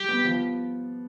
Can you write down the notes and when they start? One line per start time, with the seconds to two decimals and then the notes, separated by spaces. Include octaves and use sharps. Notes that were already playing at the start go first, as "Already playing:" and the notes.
Already playing: G3 G4
0.09 B3
0.25 F3